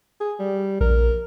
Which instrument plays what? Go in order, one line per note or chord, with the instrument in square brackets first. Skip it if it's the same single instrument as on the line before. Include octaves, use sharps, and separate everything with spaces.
[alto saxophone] G#4
G3
[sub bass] A#1 [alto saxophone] A#4